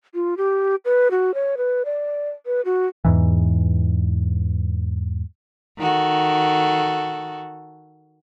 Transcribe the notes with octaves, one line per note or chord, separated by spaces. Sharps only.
F4
G4
B4
F#4
C#5
B4
D5
B4
F#4
E2 G#2 E3
D#3 F#4 A4